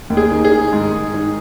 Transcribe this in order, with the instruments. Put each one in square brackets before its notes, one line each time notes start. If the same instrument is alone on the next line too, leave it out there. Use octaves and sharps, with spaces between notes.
[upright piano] D#2
G#4
D#3
G#4
D#3
G#2
G#2
D#3